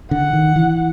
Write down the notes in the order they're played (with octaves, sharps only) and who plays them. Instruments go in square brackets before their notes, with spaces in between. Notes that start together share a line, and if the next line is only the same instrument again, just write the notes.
[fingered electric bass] D3 [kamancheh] F#5
[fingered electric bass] D#3
E3